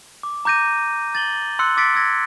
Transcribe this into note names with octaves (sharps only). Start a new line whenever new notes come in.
D6
A#5 D6 G6 A#6 D#7
A6 F#7 G7
C6 E6 F#6 C#7
D6 E6 A6 B6 C#7 D7
E6 G#6 A#6